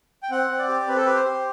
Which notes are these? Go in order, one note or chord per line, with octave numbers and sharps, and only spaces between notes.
G5
C4 F#5
C4
D5
G4
C4 B4
A4
G4 B4
C5
G4